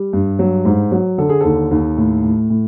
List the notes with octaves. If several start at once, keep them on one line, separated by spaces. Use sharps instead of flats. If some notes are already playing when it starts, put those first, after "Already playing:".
Already playing: G3
G2
F#3
G#2
F#3
D3 A4
G#4
D#2 A4
D#2
A2
A2
A2